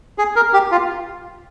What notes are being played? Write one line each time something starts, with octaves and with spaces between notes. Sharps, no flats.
G#4
A#4
G4
F4